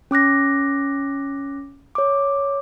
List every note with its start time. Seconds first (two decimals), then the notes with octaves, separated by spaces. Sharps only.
0.11 C#4 D6 F#6 A#6
1.95 C#5 D6